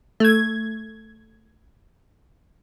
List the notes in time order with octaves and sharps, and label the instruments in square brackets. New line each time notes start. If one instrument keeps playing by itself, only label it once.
[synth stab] A3 G#6